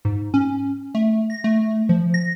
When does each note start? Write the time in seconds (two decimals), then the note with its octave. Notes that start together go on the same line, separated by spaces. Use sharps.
0.05 G#2
0.34 C#4
0.95 A3
1.30 A#6
1.44 A3
1.89 F3
2.14 A#6